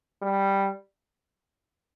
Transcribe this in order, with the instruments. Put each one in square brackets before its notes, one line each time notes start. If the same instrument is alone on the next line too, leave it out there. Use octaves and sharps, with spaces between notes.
[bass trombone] G3